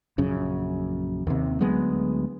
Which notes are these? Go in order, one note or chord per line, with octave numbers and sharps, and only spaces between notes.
A#1 F#2 C#3
D#2 C3
D2 F#3 G#3 B3